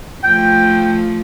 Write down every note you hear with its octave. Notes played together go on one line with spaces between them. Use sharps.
F3 A3 G5